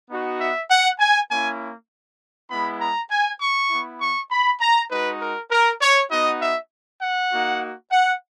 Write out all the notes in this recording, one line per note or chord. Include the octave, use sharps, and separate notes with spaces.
B3 D#4 F#4
E5
F#5
G#5
A#3 C#4 E4 G#5
G#3 B3 E4 B5
A#5
G#5
C#6
B3 E4
C#6
B5
A#5
G#3 D#4 F#4 B4
A#4
A#4
C#5
B3 D#4 F#4 D#5
E5
F#5
A#3 D#4 F#4
F#5